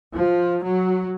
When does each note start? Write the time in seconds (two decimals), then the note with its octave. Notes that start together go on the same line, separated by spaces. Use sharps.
0.14 F3
0.62 F#3